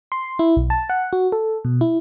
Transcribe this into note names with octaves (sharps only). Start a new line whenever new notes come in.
C6
E4
B1
A5
F#5
F#4
A4
B2
E4